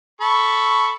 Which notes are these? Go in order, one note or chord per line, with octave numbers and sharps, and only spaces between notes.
A4 B5 C#6